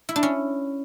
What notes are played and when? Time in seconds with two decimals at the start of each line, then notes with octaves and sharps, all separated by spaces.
0.09 E4
0.16 D4
0.23 C#4